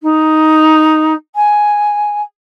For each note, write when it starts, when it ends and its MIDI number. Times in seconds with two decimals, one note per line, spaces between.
0.03 1.13 63
1.35 2.21 80